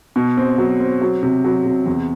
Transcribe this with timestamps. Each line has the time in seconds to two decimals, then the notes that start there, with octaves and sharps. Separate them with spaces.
0.16 B2
0.37 C4
0.58 F#3
0.80 C4
1.01 F#3
1.23 C3
1.44 F#3
1.66 C3
1.86 E2